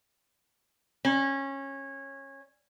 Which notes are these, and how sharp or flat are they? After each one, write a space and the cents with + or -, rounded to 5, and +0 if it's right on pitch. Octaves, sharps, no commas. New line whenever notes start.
C#4 -20